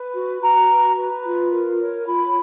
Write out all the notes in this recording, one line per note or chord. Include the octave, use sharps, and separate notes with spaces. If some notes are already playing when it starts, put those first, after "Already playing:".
Already playing: B4
F#4
F#4 A#5
B4
B4
F4
A#4
C#5
F4 B5